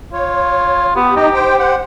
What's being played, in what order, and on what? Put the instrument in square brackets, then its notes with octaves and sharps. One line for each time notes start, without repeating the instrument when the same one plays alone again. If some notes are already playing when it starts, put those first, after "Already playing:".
[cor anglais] F4 [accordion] C#5
[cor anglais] B3 [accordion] G4
[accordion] D#4 D#5 [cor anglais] G4
[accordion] C5 G5
C5 F#5